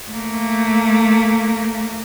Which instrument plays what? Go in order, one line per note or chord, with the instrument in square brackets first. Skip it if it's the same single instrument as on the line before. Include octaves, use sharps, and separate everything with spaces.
[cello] A3 A#3